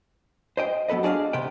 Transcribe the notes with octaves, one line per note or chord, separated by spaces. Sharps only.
C5 D#5 G5
F#3 B3 A4 B4 D#5
D4 F#4 G#4 D5 D#5 F5
C3 B3 B4 G5